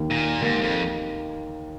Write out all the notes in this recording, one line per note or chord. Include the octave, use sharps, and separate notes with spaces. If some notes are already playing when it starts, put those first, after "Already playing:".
Already playing: D#2 D#3 A#3
A#2
D#2 G#2 D#3 A#3
F2